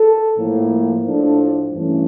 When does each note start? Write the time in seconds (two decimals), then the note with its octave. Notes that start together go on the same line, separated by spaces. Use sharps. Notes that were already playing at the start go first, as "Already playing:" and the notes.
Already playing: A4
0.38 A2 F3 A#3
1.04 A2 F3 A3 D4
1.72 G2 E3 A3 C#4